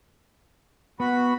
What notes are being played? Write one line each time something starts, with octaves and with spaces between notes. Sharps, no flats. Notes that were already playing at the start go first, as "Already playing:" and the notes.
B3 F#4 B5